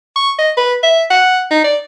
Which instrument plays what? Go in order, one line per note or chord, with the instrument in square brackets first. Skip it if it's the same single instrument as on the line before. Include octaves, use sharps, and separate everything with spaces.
[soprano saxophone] C#6
D#5
B4
E5
F#5
D#4
D5